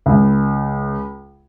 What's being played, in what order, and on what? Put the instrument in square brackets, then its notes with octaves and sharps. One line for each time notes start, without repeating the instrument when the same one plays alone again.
[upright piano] C#2